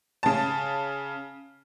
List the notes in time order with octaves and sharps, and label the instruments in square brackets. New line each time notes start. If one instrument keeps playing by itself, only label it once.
[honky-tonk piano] C#3 A5